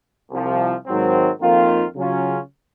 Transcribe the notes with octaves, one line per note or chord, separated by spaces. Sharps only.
C2 C3 F3
G#2 D#3 F#3 C4
F2 D#3 A#3 F4
C#3 F#3 C#4 F4